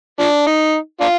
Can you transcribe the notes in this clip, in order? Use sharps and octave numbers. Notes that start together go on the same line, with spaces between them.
F3 D4
D#4
D4 F4